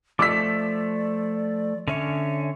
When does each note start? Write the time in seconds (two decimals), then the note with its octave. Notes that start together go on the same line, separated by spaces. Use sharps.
0.19 F3 A3 D5 D6 E6 B6
1.88 D3 C#4 C#5 E5